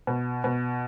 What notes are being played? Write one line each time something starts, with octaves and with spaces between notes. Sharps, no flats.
B2
B2